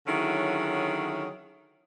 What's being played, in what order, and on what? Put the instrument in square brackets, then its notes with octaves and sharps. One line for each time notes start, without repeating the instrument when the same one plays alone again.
[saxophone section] D3 D#3 F#3 C#4 E4 G#4